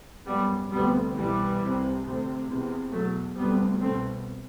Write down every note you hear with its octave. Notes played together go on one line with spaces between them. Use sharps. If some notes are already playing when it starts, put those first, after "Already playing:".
F#2 G3 B3
D2 C3 G3 B3
C2 B2 E3 G3
C2 C3
D2 C3
E2 C3
E2 B2 F#3 A3
D2 C3 G3 B3
C2 B2 A3 C4